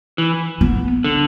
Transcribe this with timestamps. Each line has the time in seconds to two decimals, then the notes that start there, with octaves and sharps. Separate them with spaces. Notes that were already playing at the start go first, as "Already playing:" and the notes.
0.18 E3
0.61 B3
1.04 D3